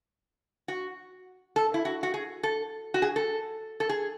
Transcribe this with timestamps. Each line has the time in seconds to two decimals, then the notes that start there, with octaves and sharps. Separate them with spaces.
0.68 F#4
1.56 A4
1.74 E4
1.85 F#4
2.03 F#4
2.14 G#4
2.43 A4
2.94 F#4
3.02 G#4
3.16 A4
3.80 A4
3.89 G#4